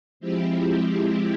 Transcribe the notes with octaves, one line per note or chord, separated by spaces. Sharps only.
F3 G#3 C4 E4 G4